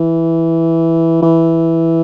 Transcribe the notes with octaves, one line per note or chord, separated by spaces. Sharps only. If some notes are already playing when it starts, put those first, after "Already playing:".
Already playing: E3
E3